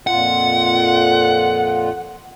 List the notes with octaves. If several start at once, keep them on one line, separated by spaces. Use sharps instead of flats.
F2 A#2 F4 F#5